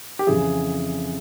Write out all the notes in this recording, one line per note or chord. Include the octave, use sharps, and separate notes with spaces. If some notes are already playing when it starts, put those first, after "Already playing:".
G4
F2 C#3 E3 G#4